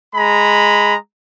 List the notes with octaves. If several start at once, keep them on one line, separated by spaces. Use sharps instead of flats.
G#3 A#5 B5